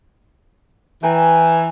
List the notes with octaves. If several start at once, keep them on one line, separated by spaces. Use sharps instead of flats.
E3 G5 G#5 A#5